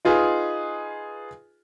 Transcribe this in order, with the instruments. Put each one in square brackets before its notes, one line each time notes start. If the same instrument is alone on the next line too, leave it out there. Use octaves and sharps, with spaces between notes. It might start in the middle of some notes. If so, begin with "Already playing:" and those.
[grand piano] D#4 F4 G#4 B4